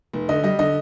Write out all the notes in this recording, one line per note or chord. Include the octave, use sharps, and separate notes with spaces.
F1
D3 D#5
G3 D#5
D3 D#5